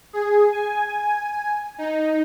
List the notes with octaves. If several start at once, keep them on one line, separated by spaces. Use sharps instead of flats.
G#4
G#5
D#4